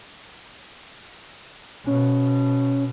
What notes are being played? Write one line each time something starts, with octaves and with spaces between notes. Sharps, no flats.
B2 C#4